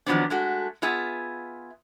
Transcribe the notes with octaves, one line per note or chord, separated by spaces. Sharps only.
D#3 F3 F#3 B3 C4 D4
G#3 A3 F#4
B3 F4 G#4 E5